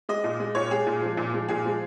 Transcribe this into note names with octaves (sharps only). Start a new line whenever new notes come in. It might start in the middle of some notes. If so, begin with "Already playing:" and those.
G#3 D#5
A#2
G#3
A#2 C#5
G#3 G#4
A#2
F3 G#3
A#2
F3 G#3
A#2 G#4
F3 G#3